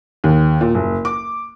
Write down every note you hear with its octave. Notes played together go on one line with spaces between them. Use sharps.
D#2
A#2
F#1
D6